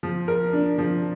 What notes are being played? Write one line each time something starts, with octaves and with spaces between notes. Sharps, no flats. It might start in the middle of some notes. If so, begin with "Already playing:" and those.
F3
A#4
D4
F3